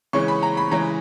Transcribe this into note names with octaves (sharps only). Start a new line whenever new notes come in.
C#3 E3 G#3 C#4 C#6
B5
A#5
B5
C#3 E3 G#3 C#4 A#5